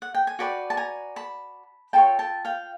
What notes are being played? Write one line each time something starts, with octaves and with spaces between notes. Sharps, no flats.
F#5
G5
G#5
F#4 B4 D5 G5 A5
A5
G#5 A#5
A5 B5
F4 A4 C#5 G5 A5
G5 A5
F5 G5